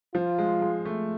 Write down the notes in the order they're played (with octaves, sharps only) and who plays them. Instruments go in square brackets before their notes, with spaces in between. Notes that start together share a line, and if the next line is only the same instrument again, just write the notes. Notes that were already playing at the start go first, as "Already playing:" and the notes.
[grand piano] F3 [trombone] F4
[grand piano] G#3
G#3
A3